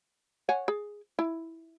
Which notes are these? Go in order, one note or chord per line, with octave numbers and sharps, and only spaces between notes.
C#5 F#5 G#5
G#4
E4